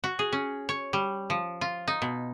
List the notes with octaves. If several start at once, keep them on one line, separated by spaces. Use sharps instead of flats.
F#4
G#4
C#4
C#5
G3
F3
F4
D#4
B2